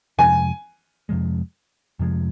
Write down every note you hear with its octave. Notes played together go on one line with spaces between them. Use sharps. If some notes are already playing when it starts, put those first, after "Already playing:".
F2 C3 F3 G#3 G#5
F2 C3 F3 G#3
F2 C3 F3 G#3